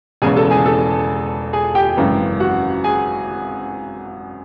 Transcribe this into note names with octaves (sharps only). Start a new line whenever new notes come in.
E1 E2 C#3 E3 G#4 G#5
A4 A5
G#4 G#5
A4 A5
G#4 G#5
G4 G5
G#1 F#2 C#3 E3
F#4 F#5
G#4 G#5